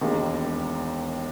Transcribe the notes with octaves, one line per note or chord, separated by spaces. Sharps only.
E1 D#2 D#3 G#3